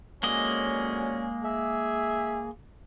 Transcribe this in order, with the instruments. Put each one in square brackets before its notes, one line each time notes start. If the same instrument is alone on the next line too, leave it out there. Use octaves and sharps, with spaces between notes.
[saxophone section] F2 F#3 D5 [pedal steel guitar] G#3 A#3 D#5 [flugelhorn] C#4
[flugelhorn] G#4 [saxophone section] E5